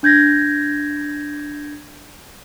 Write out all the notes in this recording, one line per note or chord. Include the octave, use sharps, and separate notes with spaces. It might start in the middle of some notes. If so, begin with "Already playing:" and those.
D4 G6 G#6 A#6